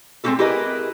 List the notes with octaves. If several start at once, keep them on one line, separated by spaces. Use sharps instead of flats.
G#3 A3 C4 D#4 G4 A4
E4 G4 G#4 A#4 B4 D#5